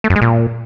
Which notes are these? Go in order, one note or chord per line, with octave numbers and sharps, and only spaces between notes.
A3
F#2
G#3
A#2